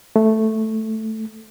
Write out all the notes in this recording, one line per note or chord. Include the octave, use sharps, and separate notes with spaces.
A3